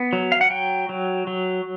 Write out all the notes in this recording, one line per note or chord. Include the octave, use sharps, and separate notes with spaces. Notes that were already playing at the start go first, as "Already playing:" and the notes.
Already playing: B3
F#3
F5
F#5
F#3 G5
F#3
F#3